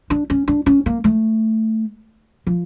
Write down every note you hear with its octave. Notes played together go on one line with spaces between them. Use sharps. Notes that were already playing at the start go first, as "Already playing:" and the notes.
D4
C#4
D4
C#4
A#3
A3
F3